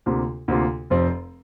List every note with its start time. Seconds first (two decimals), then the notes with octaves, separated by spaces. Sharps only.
0.06 D2 C3 A#3 F4
0.48 D2 C3 A#3 F4
0.90 F1 F2 F3 C4